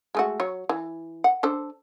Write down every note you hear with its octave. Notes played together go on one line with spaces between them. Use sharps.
G#3 A3 F#4
F#3 C#5
E3
F#5
D4 A4 C5